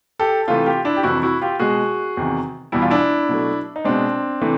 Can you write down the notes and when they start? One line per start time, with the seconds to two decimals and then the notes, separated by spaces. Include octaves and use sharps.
0.19 G4 A4
0.48 C3 E3 A3 F4 G4
0.66 F4 G4
0.85 D4 E4
0.97 G4
1.03 F2 C3 E3 E4 F#4
1.23 E4 F#4
1.41 F4 G4
1.60 B2 G#3 F#4 G#4
2.17 E2 C3 D#3
2.72 E2 B2 G3 E4
2.82 F4
2.90 D4 E4
3.29 B2 F#3 A3
3.76 D#4
3.85 B2 G#3 C4 D4
4.41 C3 E3 A3